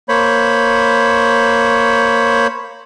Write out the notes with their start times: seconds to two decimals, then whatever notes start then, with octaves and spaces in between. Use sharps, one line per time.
0.09 A#3 C5 C#5 B5